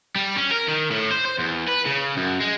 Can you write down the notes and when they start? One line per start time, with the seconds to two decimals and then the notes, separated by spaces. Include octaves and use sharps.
0.16 G3
0.36 C#4
0.51 A#4
0.68 D#3
0.91 A2
1.11 C5
1.26 C5
1.39 E2
1.69 B4
1.86 C#3
2.17 F#2
2.40 G#3